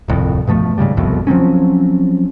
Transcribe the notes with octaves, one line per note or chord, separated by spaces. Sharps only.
D1 C2 F2
G2 B2 F3 A3
G#2 C#3 F3 G3
F#1 C2 F2 B2
F3 F#3 C4 C#4